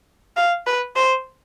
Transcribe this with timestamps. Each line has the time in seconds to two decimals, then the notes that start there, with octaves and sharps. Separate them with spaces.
0.37 F5
0.67 B4
0.96 C5